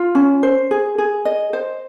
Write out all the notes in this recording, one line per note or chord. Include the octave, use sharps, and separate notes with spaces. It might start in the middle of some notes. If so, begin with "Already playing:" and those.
Already playing: F4
C#4
C5
G#4
G#4
D#5
C5